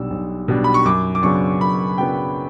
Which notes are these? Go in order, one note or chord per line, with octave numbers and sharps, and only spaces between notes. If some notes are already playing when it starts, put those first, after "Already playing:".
Already playing: B1 B2 G3 D4 E6
B1
B2 G3 D4
B5
C#6
F#2 D6
D6
C#3 F#3 B3 D4 C#6
F#2 B5
C#3 F#3 B3 D4 G5